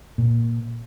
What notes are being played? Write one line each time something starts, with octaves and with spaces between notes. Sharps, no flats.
A#2